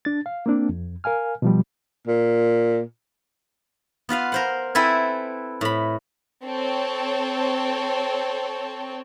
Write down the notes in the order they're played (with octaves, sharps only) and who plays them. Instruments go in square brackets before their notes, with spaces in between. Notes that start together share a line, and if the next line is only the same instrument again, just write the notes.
[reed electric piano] D4 A6
F5
A#3 C4 D4
F2
A#4 F5 G#5 F6
B2 F3 G3
[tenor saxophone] A#2
[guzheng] B3 F4 B4 F5
A#4 C5 F#5
C4 E4 A4 B4 E5 G#5
A2 B5
[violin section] C4 A4 C#5